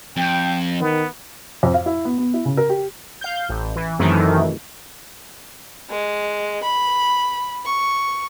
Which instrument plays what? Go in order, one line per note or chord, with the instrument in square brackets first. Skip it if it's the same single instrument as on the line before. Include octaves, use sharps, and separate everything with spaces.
[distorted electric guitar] F2 [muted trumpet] G5
[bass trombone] D#3 [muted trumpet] B3
[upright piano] F2
F5
E4
B3
B3
E4
C#3
A#4
G4
[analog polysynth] F5 G6
A1
E3
F#2 C3 D#3 E3 A3
[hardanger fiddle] G#3
B5
C#6